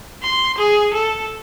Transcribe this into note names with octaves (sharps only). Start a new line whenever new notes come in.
C6
G#4
A4